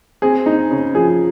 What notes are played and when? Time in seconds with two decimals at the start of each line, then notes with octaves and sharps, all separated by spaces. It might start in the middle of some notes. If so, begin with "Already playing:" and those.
0.22 C4 G#4
0.46 D#4
0.71 C#3
0.95 F3 G#4